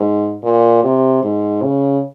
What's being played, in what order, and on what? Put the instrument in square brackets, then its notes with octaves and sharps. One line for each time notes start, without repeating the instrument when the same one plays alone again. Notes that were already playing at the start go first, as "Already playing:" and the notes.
Already playing: [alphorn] G#2
A#2
C3
G#2
C#3